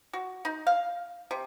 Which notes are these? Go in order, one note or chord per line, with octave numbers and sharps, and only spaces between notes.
F#4
D#4
F5
C3